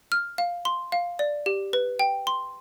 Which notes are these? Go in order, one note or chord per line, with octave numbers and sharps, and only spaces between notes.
F6
F5
C6
F5
D5
G4
B4
G5
C6